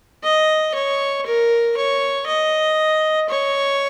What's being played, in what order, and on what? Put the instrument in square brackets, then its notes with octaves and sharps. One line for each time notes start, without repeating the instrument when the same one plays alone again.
[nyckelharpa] D#5
C#5
A#4
C#5
D#5
C#5